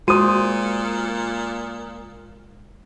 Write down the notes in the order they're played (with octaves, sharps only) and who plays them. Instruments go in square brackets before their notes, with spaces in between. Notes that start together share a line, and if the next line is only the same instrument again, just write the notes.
[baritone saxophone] A#2 [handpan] G#3 C5 [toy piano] F#4 [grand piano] D#6 D#7